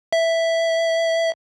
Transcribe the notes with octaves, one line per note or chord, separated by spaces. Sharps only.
E5